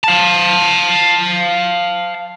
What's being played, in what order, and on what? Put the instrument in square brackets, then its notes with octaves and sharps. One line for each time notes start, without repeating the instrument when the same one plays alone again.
[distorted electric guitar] F5 A5